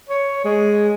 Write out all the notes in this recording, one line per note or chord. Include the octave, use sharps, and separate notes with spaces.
C#5
G#3